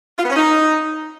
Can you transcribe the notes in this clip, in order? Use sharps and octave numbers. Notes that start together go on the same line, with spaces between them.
F4
B3
C#4
D#4